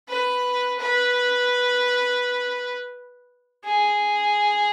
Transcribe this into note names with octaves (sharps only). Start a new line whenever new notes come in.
B4
B4
G#4